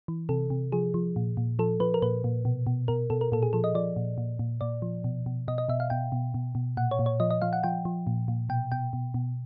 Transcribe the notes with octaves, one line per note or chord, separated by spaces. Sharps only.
E3
C3 A4
C3
F3 G#4
F3
A#2
A#2
F3 A4
F3 B4
A#4
A#2 B4
A#2
B2
B2
B2 A#4
B2 A4
A#4
A#2 A4
G#4
F3 A4
D#5
F3 D5
A#2
A#2
A#2
A#2 D5
F3
B2
B2
B2 D#5
D#5
B2 E5
F5
B2 G5
B2
B2
B2
A#2 F#5
C#5
A#2
C#5
F3 D#5
D#5
F3 F5
F#5
F3 G5
F3
A#2
A#2
B2 G5
B2 G5
B2
B2